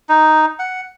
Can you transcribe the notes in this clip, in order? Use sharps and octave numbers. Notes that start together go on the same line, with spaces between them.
D#4
F#5